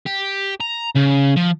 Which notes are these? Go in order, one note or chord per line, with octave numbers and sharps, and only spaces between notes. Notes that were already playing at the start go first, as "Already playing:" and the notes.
G4
A#5
C#3
F3